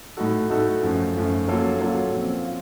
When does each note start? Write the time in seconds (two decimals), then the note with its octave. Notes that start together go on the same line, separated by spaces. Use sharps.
0.17 A2 A3 D#4 F#4 A4
0.50 A2 A3 D#4 F#4 A4
0.83 F#2 F3 A3
1.16 F#2 F3 A3
1.48 F#3 A#3 C#4 F4 A4
1.81 F#3 A#3 C#4 F4 A4
2.13 A#2 F3 C4 F4
2.46 F4